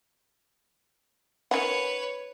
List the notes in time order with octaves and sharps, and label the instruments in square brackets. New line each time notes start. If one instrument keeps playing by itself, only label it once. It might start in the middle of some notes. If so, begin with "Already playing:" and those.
[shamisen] D#3 C#4 F#5 [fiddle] B4 C#5